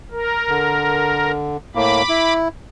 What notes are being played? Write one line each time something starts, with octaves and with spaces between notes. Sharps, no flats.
A#4
D3
A2 A#3 B5 D6
E4